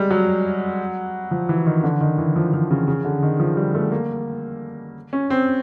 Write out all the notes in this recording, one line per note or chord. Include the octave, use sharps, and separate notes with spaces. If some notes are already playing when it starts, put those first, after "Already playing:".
Already playing: G3 G#3
F#3
F3
E3
D#3
D3
D#3
E3
F3
F3
C#3
C#3
D3
D#3
F3
G3
A3
A#3
C#4
C4